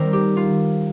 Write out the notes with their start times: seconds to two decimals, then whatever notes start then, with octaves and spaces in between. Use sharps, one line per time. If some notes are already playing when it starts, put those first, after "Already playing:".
Already playing: D#3 G3 C4 A#4 C5
0.13 G4
0.37 F4